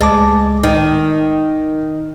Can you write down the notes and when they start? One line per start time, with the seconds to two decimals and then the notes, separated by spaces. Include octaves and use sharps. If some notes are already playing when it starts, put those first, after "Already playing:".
0.01 C#2 G#3 A5 D6
0.63 D#3 D#4 D#5